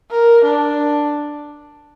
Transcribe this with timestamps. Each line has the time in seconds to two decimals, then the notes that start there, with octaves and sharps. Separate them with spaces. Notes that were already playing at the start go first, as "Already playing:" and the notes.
0.11 A#4
0.45 D4